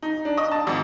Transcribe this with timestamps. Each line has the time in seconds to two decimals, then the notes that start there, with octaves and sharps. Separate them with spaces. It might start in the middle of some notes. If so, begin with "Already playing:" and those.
0.02 D#4
0.25 D4
0.37 D#5
0.51 A5
0.67 G#1